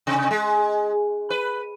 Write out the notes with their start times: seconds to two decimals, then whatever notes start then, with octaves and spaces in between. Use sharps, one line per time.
0.07 C3
0.31 G#3
1.30 B4